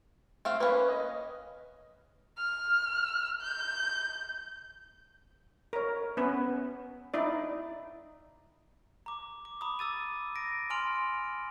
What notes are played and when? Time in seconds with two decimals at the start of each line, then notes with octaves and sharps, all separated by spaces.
0.45 A3 C4 F5
0.60 A#3 C#4 B4
0.87 D#5
2.37 F6
3.41 G6
5.73 A#4 C#5
6.17 B3 C#4 B4
7.14 D#4 E4 D5
9.06 A#5 D6
9.45 D6
9.61 A#5 B5 D6 D#6
9.79 D6 E6 A6 D#7
10.36 A#6 D7
10.70 G#5 A#5 C6 F6 D7 F7